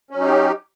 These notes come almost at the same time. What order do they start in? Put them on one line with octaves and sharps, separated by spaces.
C#4 F#3 D#4 G4